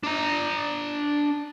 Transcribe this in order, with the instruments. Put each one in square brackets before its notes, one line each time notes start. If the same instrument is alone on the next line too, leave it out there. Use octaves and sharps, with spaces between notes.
[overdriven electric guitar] D4 A#5